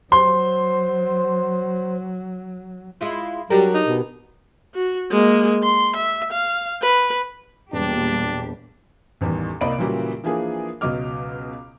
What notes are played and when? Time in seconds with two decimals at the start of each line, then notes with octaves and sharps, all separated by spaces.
0.12 F#3 C5 C6
3.01 G#3 E4 F4
3.50 F#3 G3 D4 G4 A#4
3.74 D#4
3.87 B2
4.74 F#4
5.11 G#3 A#3
5.63 C6
5.96 E5
6.32 F5
6.82 B4
7.73 E1 A#2 G3 D4 G4
9.21 A1 E2 D#3 G3
9.61 C2 A#3 D5 D#5 B5 D7
9.78 A#2 C#3 E3 F#3 G3 A#3
10.24 E3 F3 A#3 D4 G#4 A#4
10.81 C#2 B2 F#3 D#5 D6 F6